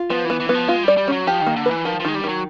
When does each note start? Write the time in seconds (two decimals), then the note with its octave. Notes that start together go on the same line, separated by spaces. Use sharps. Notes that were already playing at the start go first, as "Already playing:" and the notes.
Already playing: F4
0.10 F3 B3
0.25 E3 B3
0.40 E3
0.49 B3
0.54 F3
0.68 G#3 F4
0.84 G3 D5
0.98 G3
1.08 F#3 C#4
1.27 F3 G4
1.41 D#3
1.47 A#3
1.56 D3
1.66 B4
1.71 E3
1.85 D#3 F3
2.00 F3
2.05 D#3 G#3
2.15 G3
2.24 D#3
2.29 F#3